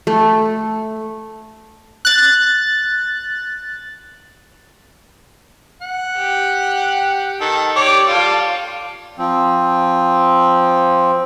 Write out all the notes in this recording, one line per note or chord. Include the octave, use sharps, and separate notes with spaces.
A3
F#6 A6
F#5
G4
D#3 A4
G4 C#5 D5 D6
G3 F4 A4
F3 C4